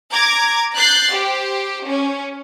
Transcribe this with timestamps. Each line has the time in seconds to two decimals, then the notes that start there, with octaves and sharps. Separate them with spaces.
0.11 A#5 D6 G#6
0.76 F#6 G6 A6 C7
1.12 G4 C5
1.86 C#4